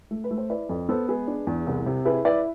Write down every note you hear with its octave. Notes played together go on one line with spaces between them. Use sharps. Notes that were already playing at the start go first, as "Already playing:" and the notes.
A3
B4
A3
C5
E4 B4 D5
F2
B3 A4 C5
G#3 G#4 B4
D4
E2
C2
C3
E4 G#4 B4
E4 B4 D5